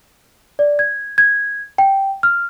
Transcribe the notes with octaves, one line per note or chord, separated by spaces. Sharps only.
D5
G#6
G#6
G5
F6